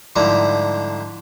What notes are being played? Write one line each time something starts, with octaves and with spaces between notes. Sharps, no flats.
G#2 D3 F3 G3 E4 A#5